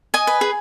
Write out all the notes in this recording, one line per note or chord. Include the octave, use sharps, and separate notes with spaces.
D#5 G#5
B4
G#4